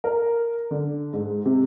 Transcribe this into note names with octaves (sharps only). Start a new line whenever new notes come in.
A#4
D3
G#2
C3